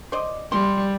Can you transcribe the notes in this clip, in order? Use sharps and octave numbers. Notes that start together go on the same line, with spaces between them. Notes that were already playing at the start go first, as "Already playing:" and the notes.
C5 D5 D#5
G3 C6